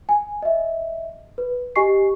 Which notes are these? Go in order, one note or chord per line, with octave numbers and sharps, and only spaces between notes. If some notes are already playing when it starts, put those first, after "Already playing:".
G#5
D#5 E5
B4
G4 D#5 G#5 C#6 C7